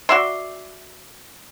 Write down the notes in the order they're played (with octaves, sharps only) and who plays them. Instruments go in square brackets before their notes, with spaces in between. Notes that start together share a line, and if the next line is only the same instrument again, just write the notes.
[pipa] F#4 D5 E5 C6